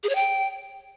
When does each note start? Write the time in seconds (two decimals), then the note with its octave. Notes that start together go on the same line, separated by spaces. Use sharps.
0.04 G#4
0.09 C#5
0.15 G5